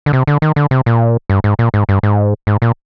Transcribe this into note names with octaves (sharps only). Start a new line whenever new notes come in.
D3
C3
D3
D#3
D3
C3
A#2
G2
G#2
A#2
G#2
G2
G#2
G#2
A#2